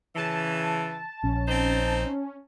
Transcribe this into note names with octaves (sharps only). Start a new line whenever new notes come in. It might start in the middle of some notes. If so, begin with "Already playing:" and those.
C#3 E3 A5
A#1 C#4
C4 D#4 C5